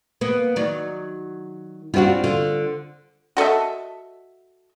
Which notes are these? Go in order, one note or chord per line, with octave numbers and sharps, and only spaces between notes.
A#3 B3
D#3 F#3 D5
G3 C4 D4 F4 F#4
D3 F4
F#4 A4 D#5 E5